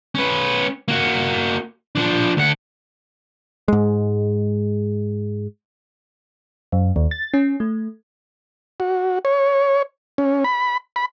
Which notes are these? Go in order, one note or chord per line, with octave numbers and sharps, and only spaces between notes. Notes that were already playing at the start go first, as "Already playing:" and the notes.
C#4 B4
A#3 F#4
F3 D4
D2 F#5
G#2 G#3
F#2
D#2
A6
C#4
A3
F#4
C#5
C#4
B5
B5